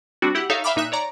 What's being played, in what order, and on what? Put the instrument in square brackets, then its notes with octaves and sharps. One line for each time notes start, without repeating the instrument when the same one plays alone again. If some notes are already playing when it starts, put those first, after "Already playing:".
[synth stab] G3 C4 D4 F#4
E4 G4 F#5
D#4 A4 C#5 E5 F5
E5 F5 G5 B5 D6 F6
A#2 D#4 E5 F#6
C#5 D5 A#5